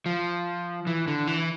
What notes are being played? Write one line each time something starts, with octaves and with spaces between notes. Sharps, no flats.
F3
E3
D3
E3